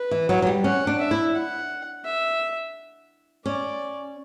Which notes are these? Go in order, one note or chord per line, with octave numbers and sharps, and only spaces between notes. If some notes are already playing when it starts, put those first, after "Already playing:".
Already playing: B4
E3
F#3
F#3
G3
C#4 F#5
D4
E5
E4
F#5
E5
C#4 D5